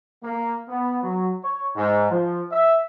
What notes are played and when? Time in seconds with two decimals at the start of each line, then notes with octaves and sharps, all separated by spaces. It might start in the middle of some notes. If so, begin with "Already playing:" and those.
0.23 A#3
0.68 B3
1.03 F#3
1.44 C#5
1.75 G#2
2.10 F3
2.52 E5